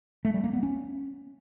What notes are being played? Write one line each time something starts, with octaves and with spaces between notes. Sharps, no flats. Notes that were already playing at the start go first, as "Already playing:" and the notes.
A3
G3
A#3
B3
C#4